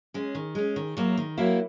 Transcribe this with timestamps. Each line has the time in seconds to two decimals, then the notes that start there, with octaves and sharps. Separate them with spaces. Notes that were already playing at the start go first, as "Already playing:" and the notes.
0.14 G#3 C#4
0.35 D#3
0.55 G#3 C#4
0.76 D#3
0.97 F#3 A#3 E4
1.17 D#3
1.37 F#3 A#3 E4